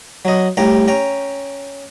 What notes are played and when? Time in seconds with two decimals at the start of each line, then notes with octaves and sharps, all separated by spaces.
0.25 F#3 D#5
0.57 C2 A2 G4 G5 A#5
0.88 C#4 G5 A#5